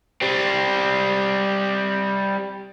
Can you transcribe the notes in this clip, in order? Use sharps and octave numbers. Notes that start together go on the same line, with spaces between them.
G3 C4